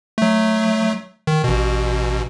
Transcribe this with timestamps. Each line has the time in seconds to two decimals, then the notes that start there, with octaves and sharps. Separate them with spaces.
0.18 F#3 A3
1.27 D#3
1.44 A1 B2